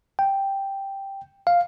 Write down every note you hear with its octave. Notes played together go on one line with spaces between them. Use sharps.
G5
F5